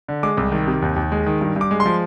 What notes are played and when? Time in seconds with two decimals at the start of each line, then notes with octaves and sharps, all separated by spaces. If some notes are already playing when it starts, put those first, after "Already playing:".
0.08 D3
0.23 G#3 D6
0.37 C2
0.52 D#3
0.67 C3
0.82 D#2
0.96 D#2
1.12 G#3
1.26 D#3
1.41 G2
1.56 G2 D6
1.71 G#3
1.80 C6
1.86 F3